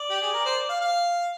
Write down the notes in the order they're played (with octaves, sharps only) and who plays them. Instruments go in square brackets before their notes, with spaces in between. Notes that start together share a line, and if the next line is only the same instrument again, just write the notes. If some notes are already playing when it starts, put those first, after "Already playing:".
Already playing: [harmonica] D5
G4
G#4
A#4
C5
D5
F5
F5